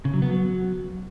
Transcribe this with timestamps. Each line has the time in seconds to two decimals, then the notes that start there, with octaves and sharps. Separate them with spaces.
0.05 C#3
0.14 F#3
0.22 B3
0.31 F#3